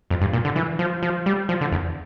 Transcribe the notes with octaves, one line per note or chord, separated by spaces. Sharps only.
F2
G2
A#2
D3
E3
F3
F3
G3
F3
D3
E2